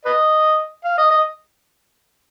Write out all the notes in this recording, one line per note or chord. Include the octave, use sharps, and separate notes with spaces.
B4 D#5
F5
D#5
D#5